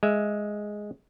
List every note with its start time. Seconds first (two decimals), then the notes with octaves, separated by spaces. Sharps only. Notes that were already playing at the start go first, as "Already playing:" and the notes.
0.03 G#3 E5